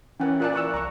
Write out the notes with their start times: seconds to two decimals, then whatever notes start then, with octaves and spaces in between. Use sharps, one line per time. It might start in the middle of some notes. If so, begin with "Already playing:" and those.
0.20 E3 C#4 A#4 F#5 G5
0.40 A#2 F4 D5 A5 F#6
0.53 A#4 C#6 E6
0.74 C2 A#5 C#6